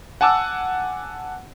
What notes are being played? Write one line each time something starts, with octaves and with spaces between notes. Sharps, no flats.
F#5 G#5 A5 D6 E6